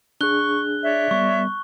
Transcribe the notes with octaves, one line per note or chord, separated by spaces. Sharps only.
D4 G#4 C#6 F#6 G7
C#5 D5 E5
G3 B3 C#6